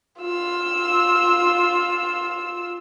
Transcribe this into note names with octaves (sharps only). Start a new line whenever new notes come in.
F4 E6